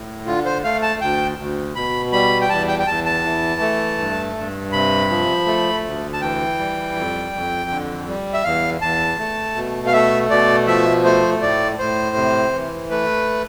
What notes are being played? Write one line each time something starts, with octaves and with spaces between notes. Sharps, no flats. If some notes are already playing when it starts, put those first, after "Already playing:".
Already playing: A2
D3 F4
C5
A3 F5
A5
D2 G5
D2
B2 B5
G3 B5
G5
E2 A5
G5
G5
E2 A5
A5
E3
A3
G2
G2
C3 B5
F3
A3
D2
A5
E3 G5
G3
F2
F2
D3
G3
E5
E2 F5
E2 A5
A3
B2
F5
A3 E5
B2 D5
F3 E5
A3 C5
A2 D5
A2 C5
C3
E3
A3 B4